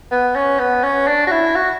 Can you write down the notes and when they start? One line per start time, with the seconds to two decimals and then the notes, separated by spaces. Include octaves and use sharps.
0.11 B3
0.36 C#4
0.59 B3
0.84 C#4
1.07 D4
1.27 F#4
1.31 E4
1.56 F#4